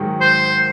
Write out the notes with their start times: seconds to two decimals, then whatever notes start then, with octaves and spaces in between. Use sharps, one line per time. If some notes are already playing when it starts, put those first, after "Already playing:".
Already playing: G#2 D#3 F#3
0.21 C5